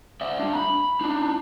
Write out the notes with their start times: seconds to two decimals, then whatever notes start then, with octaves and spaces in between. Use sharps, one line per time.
0.21 D5 E5
0.40 G3 D4
0.53 A#5 B5
1.01 D4 D#4